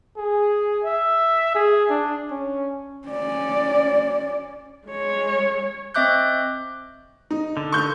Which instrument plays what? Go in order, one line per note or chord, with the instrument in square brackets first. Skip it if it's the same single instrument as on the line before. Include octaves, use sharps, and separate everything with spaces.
[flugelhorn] G#4
E5
G#4
D4
C#4
[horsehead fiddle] C#4 D5
G#3 C#5
[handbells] C4 D#5 E5 D6 F#6 G6
[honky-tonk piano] D#4
[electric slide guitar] D3
[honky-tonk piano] C#6 G6